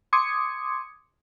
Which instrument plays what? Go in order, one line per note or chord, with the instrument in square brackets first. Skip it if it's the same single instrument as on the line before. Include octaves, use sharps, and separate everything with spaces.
[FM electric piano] C6 D6 D#6 G#6 C#7